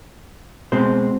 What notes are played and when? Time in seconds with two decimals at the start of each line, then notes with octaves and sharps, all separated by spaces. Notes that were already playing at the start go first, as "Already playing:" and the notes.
0.72 B2 G#3 C4 C5